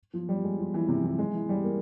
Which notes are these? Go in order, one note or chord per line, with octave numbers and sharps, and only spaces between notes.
F3
G3
G#3
F3
E3
C3
E3
G#3
E3
G3
A#3